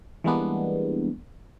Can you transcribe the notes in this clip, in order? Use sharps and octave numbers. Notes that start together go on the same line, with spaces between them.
E3 G3 G#3 A#3 B3 D4